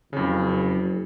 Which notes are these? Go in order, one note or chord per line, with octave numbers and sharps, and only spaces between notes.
F#1 F2 C#3